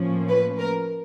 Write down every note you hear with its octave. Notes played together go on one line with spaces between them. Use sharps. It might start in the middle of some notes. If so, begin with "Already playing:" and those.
Already playing: A2 F3 A#3 C#4
B4
A#4